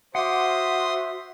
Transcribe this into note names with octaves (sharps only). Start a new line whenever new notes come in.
F#4 C5 E5 F#5 C6 D6 D#6